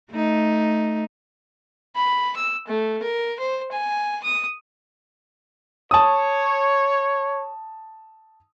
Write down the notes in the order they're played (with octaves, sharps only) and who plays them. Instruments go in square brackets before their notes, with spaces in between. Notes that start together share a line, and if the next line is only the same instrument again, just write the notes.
[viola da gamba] A3 D#4
[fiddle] B5
E6
A3
A#4
C5
G#5
D#6
[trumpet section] C#5 [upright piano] A5 D#6